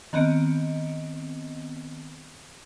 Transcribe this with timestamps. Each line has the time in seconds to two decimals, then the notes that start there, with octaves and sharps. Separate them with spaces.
0.13 D#3 B3 C4 D#5 C#7 D7